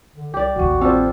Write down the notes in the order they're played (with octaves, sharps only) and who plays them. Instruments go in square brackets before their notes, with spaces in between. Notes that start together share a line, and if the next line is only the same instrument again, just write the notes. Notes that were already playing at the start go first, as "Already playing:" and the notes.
[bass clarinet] D3
[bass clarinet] C2 [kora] G4 D5
[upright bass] A1 D#2 [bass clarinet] F#4
[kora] G3 F4 A4 [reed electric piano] C4 C5